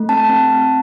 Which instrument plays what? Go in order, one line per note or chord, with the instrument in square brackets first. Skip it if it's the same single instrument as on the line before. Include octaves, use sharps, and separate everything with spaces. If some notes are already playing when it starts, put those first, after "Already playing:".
Already playing: [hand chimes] A3
C4 A5
C4
C4